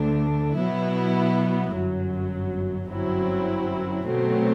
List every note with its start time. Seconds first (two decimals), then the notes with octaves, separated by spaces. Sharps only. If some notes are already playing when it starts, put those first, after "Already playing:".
Already playing: D2 D3 A3 D4
0.55 B2 F#3 B3 E4
1.72 G1 F#2 F#3
2.88 G1 F#2 F#3 C4 E4
4.06 B2 F#3 A3 C4